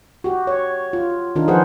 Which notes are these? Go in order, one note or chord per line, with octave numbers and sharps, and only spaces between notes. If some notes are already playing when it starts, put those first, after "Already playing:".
F#4 G4
C#5
F4
D#3 D4 D#4 F4 A#4
F3 G#4 B4 C5 F#5